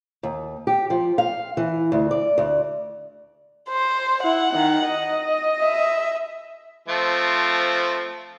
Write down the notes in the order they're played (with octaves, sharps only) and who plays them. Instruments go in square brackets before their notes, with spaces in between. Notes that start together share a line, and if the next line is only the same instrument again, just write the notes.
[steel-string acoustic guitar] D#2
G4
F3
F5
E3
D2
D5
D2
[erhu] C5
[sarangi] E4 [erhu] F#5
[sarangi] D#3
D#5
[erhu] E5
[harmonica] F3 A3 C4